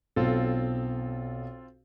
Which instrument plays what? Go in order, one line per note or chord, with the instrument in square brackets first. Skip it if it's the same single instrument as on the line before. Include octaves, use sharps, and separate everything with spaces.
[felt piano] B1 [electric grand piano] C4 F4 A4